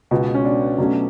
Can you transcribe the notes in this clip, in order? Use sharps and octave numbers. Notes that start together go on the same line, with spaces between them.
C#2 B2 G#3 B3
C#4
D4
B2 F#3 A3 C#4 F#4